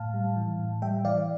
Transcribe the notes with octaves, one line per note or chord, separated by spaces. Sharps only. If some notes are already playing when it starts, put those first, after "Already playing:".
Already playing: A2 F5 A5
G3
E3
A2
G3 E5 G5
E3 D5 F5